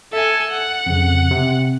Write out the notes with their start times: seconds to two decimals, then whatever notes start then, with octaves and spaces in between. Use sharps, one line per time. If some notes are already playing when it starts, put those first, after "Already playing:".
0.13 A4 E5 G#5
0.51 F#5
0.86 F2 C#3
1.31 C3